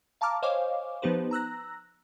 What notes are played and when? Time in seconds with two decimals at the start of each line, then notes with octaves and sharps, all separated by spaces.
0.21 F5 A5 A#5 D6 F6
0.43 C5 C#5 D#5 F5 G#5 D6
1.02 F3 B3 D#4 G4 B4 C5
1.31 A#5 E6 F#6 A#6